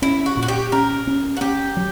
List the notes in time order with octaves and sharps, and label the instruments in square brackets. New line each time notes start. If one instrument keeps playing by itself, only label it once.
[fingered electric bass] C#4 [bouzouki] E4
[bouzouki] F#4
[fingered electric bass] A#2
[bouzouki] F#4
G4
[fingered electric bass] C#4 [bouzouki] A#4
[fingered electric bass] C#4
[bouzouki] F#4
[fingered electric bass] C#4 [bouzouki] G4
[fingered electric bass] F#3